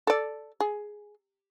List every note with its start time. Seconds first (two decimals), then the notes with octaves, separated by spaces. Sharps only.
0.07 A4 D5
0.60 G#4